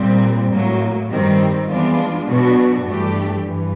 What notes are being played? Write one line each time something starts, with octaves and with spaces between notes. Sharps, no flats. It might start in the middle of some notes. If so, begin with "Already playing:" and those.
Already playing: A#2 G3 C4
A2 F#3 A#3
G2 D#3 G3 C4
E3 G#3 B3 D4 F4
B2 F#3 B3 D4 F#4
G2 E3 A3 D4 G4
G2 E3